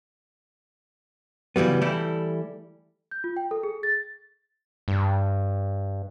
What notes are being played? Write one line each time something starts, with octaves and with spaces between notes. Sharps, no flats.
C#3 E3 F#3 G3 B3
E3 G3 A3 E4 A4
G6
F4
G5
A4
G#4
A6
G2